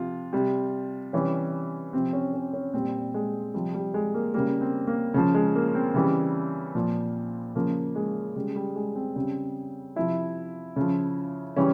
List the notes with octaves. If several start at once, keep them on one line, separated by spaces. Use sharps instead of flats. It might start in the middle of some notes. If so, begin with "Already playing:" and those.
Already playing: C3 F3 F4
C3 G3
C3 E3 G3 C#4
C3 F3 C4
C#4
C#4
C#4
A#2 G3 C4
G#3
C3 F3 G3
G3
G#3
A#3
C#3 G3 A#3
C4
A#3
C#3 F3
G#3
A#3
C4
C#3 E3 G3
A#2 F3
C#3 F3 A#3
G#3
C#3 G3 G#3
G3
G#3
C4
C#3 G3 C4
C3 F3 E4
C#3 F3
C#3 E3 G3 C#4